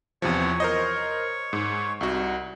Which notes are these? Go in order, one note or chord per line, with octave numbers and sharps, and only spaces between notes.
E2 C3 F3 C#5 C#6
A#4 C5 D#5
G#2
C2 D#4 F#4